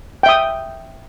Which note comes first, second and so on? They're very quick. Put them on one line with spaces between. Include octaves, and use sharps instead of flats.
G5 E5 D#6